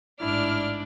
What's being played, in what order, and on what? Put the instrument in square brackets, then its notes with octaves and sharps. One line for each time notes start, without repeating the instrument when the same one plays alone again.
[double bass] A1 G#2 [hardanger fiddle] D4 D5 [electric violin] E4 [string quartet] F6